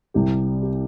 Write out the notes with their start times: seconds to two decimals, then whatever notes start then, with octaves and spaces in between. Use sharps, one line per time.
0.14 C2 C3 G3 G4
0.63 G4